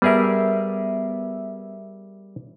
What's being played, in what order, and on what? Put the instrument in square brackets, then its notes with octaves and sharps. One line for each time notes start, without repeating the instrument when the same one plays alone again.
[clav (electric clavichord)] G3 G#4 A#4 [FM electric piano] B3 E5